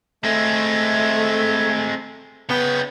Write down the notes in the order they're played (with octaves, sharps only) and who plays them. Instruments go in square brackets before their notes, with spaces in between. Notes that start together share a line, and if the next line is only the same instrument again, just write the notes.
[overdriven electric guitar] G#3 C4 [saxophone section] A3
[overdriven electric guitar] C#3 G5 [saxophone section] B3